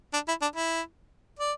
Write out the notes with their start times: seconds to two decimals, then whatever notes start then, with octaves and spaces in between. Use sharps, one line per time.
0.13 D4
0.28 E4
0.42 D4
0.55 E4
1.39 D5